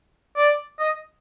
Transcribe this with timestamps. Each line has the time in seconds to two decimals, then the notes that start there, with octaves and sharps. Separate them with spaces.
0.36 D5
0.80 D#5